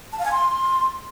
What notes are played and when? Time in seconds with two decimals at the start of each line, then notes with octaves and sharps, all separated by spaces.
0.12 A5
0.19 F5
0.25 G#5
0.32 C6